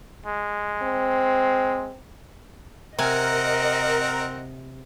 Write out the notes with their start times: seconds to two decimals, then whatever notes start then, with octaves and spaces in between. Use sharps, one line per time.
0.26 G#3
0.82 C4
2.98 C3 C4 A#4 D#5 F#5 G#5